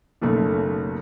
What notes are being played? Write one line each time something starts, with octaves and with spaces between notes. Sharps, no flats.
F#1 B1 A3